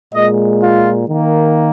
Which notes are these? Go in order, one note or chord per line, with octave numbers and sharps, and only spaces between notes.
A#2 G#3 D#5
F4
D#3 A#3